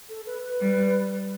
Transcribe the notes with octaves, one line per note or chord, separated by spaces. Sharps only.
A4
B4
B4
G3